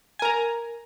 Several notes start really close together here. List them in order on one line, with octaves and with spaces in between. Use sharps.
G#5 A#4 A#5